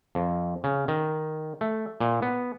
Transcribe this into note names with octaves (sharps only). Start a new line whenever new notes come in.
F2
C#3
D#3
A3
A#2
B3